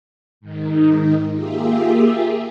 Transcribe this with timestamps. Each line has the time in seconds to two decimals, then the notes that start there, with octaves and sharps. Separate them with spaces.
0.41 G#2 D#3 D#4
1.32 A#3 F4 G4 G#4 E5